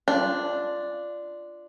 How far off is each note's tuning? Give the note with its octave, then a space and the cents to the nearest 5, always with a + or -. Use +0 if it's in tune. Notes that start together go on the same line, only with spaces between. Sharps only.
D4 +0 F4 -10